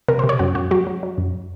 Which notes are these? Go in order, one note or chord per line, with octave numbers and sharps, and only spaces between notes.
C3 A#4
C3 C5
C#5
F#2 F#4
F#2 F#4
F#3 F#4
F#3
F#3
F#2